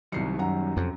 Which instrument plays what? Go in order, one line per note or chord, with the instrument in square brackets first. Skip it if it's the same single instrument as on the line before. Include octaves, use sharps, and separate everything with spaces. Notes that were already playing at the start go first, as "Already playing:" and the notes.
[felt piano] C2 C7 C#7 [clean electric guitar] D#3 F#3 G3
[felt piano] F#2 F#5 A#5
[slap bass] F2 [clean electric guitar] C3